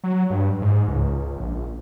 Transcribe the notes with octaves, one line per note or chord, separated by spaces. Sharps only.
F#3
G2
G#2
C#2
A#1